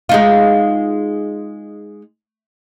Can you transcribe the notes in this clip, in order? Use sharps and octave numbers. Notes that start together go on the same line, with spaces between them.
G#3 D#4 F4